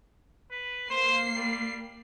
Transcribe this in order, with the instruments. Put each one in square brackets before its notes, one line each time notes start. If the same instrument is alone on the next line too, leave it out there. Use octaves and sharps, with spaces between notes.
[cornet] B4
[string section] A#3 C7 [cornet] C5
[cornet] G3